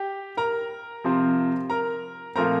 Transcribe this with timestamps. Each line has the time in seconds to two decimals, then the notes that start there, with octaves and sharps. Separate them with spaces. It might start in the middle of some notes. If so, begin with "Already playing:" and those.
Already playing: G4 G5
0.37 A#4 A#5
1.04 C3 F3 C4
1.70 A#4 A#5
2.35 A#2 F3 A3 C4 A#4 A#5